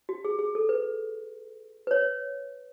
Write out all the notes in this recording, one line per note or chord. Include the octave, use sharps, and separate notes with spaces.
F#4
G#4
G#4
A4
B4
B4
C#5